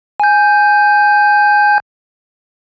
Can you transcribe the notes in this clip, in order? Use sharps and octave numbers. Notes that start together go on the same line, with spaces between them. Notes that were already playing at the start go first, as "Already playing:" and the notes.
G#5 G6